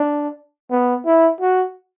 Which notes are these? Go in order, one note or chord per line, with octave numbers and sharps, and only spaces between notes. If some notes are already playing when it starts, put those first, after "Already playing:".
Already playing: D4
B3
E4
F#4